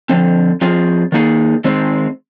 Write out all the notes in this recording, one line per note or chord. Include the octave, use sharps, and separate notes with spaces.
D3 F3 C4
F3 C4 F4 G#4
D#3 A#3 D#4 G#4
D#3 G#3 C4